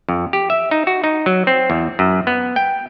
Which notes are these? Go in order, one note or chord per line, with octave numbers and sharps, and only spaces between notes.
F2
G4
E5
D#4
F#4
D#4
F#3
C4
E2
F#2
B3
G5